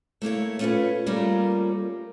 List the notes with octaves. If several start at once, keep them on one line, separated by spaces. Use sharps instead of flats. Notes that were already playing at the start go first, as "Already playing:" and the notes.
A3 A#3 E4 C#5
A3 B3 C#4 E4 F4 B4
G3 A3 A#3 C#4 F4 A#4